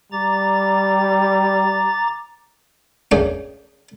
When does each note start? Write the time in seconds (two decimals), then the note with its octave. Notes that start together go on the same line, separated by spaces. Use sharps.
0.12 G3 A#5 D6 A6
3.11 A3 A#3 C#4 D4 G#4 G5